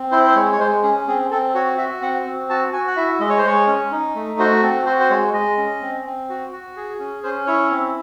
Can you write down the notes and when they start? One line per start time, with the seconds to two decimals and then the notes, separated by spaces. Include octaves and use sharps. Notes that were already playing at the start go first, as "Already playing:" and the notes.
Already playing: C4
0.12 E4 C5
0.27 C5
0.35 G#3 C#5
0.52 C#5
0.60 G#3 C5
0.83 C#4 G#4
1.07 C4 G#4
1.31 C4 A4
1.55 F#4 C#5
1.78 F#4 E5
2.02 C4 F#5
2.26 C4
2.50 F#4 A5
2.73 F#4 G#5
2.88 F#5
2.96 E4 E5
3.20 G#3 D#5
3.30 C#5
3.38 C5
3.44 G#3 C#5
3.67 C#4
3.92 D#4
4.16 A3
4.39 F#4 C5
4.63 C4 A4
4.86 F#4 C5
5.00 C5
5.10 G#3 C#5
5.33 G#3 D#5
5.58 C#4
5.82 C4
6.06 C4
6.29 F#4
6.52 F#4
6.77 G#4
6.99 C#4
7.24 C#4 C5
7.47 E4 C#5
7.71 C4